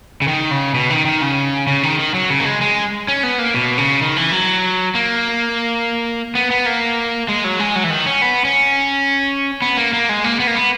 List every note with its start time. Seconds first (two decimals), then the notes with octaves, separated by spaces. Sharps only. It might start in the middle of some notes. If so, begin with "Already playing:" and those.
0.22 C#3
0.28 D#3
0.51 C#3
0.74 B2
0.90 D#3
1.05 D#3
1.22 C#3
1.67 C#3
1.83 D#3
1.99 D#3
2.14 F#3
2.30 C#3
2.40 A#3
2.45 G#3
2.61 G#3
3.08 C#4
3.23 B3
3.39 A#3
3.54 B2
3.78 C#3
4.01 D#3
4.16 E3
4.32 F#3
4.95 A#3
6.35 B3
6.51 B3
6.66 A#3
7.29 G#3
7.44 F#3
7.59 G#3
7.76 F#3
7.84 E3
7.91 D#3
8.06 C#4
8.22 B3
8.45 C#4
9.62 B3
9.77 A#3
9.93 A#3
10.09 G#3
10.24 A#3
10.40 B3
10.47 A#3
10.55 B3